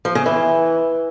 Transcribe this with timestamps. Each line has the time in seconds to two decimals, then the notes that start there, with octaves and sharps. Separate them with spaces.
0.05 F3
0.15 C#3
0.26 E3